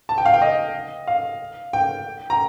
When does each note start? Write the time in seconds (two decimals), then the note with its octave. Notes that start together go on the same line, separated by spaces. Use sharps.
0.09 A5
0.18 G5
0.26 F5
0.34 G5
0.42 D#5
1.07 F5
1.73 G5
2.30 A#5